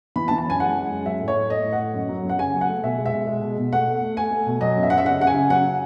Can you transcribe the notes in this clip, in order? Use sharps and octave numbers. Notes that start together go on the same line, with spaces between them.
E3 B5
A5
E3
A5
F#2 G#5
G#3 F#5
G#3
F#2
F#3 E5
A2
C#5
A2
A3 D#5
A2
F#5
A2
F#2
F#3
F#2
F#5
C#3 G#5
F#3
F#5
A3
B2 E5
G#3
E5
B2
G#3
B2
B2
A3 F#5
A3
A3
A3 G#5
A3
B2
F#3 D#5
F#2
E5
F#2 F#5
E5
C#3 F#5
C#3 F#5
G#5
C#3
F#3 F#5